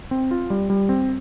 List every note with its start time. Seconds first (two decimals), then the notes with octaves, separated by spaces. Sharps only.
0.11 C4
0.31 F4
0.50 G3
0.70 G3
0.89 C4